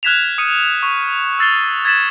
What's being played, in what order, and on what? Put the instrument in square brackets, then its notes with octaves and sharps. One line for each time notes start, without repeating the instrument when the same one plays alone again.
[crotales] F6 F#6 G#6 B6 E7 F7
D#6 C#7 D#7
C#6
E6 A6 C7 G7
G#6 A6 B6 E7 F#7